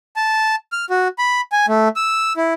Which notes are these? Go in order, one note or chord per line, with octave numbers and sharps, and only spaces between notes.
A5
F6
F#4
B5
G#5
A3
E6
E4